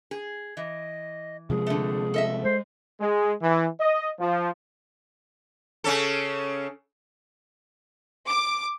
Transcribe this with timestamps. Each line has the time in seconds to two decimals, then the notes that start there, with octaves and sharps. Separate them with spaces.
0.11 G#4
0.57 E3 D#5
1.50 C3 F3 G#3 G#4
1.67 D3 A3
2.14 A4 D#5 E5
2.45 G#3 C5
3.01 G#3
3.41 E3
3.80 D#5
4.19 F3
5.84 C#3 C#4 A4
8.29 D6